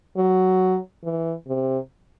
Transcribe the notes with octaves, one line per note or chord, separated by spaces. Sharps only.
F#3
E3
C3